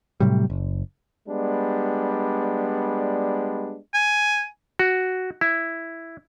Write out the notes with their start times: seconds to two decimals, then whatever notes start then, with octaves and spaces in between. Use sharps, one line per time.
0.20 A2 C3 F#3 G3
0.50 F#1
1.29 G3 G#3 B3 D4
3.94 G#5
4.79 F#4
5.41 E4